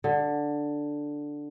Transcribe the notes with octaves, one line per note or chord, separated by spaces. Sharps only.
D3